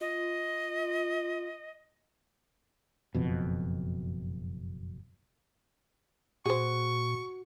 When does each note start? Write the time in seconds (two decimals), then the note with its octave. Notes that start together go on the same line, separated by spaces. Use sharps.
0.01 F4 D#5
3.15 F#1 F2 B2
6.46 A#2 F#4 G#4 C5 C#6